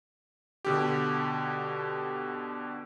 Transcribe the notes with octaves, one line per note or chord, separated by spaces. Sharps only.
B2 D3 G4